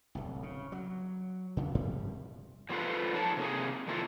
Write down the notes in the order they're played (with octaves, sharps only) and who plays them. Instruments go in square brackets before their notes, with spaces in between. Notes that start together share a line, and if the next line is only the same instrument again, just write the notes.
[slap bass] D1 C2
C#3
F#3
D#2 C#3
G2 C3 F3 G3
[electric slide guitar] F3 A#3 C4 F4 A4 B4
F3 D#4 A4 C#5 A5
C3 A#3 G#4
D#3 F3 A#3 E4 F4 A4